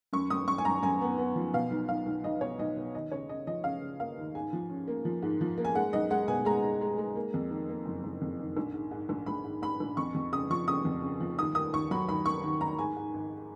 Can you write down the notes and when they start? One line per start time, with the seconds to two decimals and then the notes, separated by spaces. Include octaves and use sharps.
0.13 F#2 C#6
0.30 F#2 D#6
0.48 F#2 C#6
0.58 G#5
0.65 F#2 A#5
0.83 F#2 G#5
1.01 B3
1.18 B3
1.36 F3
1.54 B2 F5
1.70 B1
1.88 B1 F5
2.06 B1
2.24 B1 D#5
2.41 B2 C#5
2.59 B1 D#5
2.76 B2
2.94 D#2 D#5
3.12 C#3 C#5
3.29 C#3 D#5
3.47 F3 D#5
3.64 C#3 F5
3.82 C#3
4.00 A#3 F5
4.17 D#2
4.35 G#2 G#5
4.53 F3
4.69 C#4
4.88 A#3
5.05 F3
5.22 G#2
5.41 F3
5.58 A#3
5.65 G#5
5.75 G#3 F#5
5.93 B1 D#5
6.10 G#3 F#5
6.28 B2 G#5
6.45 G#3 A#5
6.64 G#3
6.81 G#3
6.98 G#3
7.16 A#3
7.34 F2
7.51 D#3
7.69 A#3
7.86 F#1
8.04 F#1
8.22 F2
8.39 D#3
8.57 A#1
8.74 G#2
8.91 G#2
9.09 A#1
9.26 A#1 B5
9.44 G#2
9.62 G#2 B5
9.80 A#1
9.97 F2 C#6
10.15 F2
10.32 C#3 D#6
10.50 F3 C#6
10.68 C#3 D#6
10.85 F2
11.02 C#3
11.20 F3
11.39 D#2 D#6
11.55 D#3 D#6
11.73 D#2 C#6
11.91 F#3 B5
12.08 D#2 B5
12.26 D#3 C#6
12.43 D#2
12.61 D#3 A#5
12.79 G#2 G#5
12.96 G#2
13.14 G#1